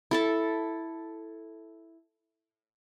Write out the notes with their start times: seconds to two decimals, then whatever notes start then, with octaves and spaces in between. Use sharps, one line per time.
0.11 E4 A4 A5